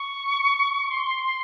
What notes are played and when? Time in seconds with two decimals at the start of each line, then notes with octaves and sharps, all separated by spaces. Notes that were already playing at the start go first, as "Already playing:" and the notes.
Already playing: C#6
0.91 C6